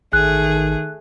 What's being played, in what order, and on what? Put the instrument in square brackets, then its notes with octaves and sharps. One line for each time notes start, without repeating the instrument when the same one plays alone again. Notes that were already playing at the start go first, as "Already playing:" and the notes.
[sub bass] A1 [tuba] D#3 [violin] A3 G#4 [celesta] F#6